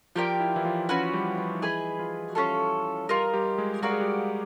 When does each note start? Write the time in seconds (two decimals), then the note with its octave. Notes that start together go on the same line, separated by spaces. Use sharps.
0.15 F3 F4 G4 A#4 D5 G5
0.40 E4
0.48 F4
0.56 E3 E4
0.65 F3 F4
0.89 F3 C#4 F4 F#4 B4
1.13 G3 G4
1.38 F3 F4
1.54 D#4
1.62 E3 E4 G#4 B4 D#5 G#5
1.99 F3 F4
2.30 F#4
2.35 G3 C#4 F4 G4 A4
3.09 G3 F4 G4 A#4 D#5
3.33 G3 G4
3.58 G#3 G#4
3.82 G#3 F#4 G#4 A#4 D5 F5
3.92 G#4
4.01 G3 G4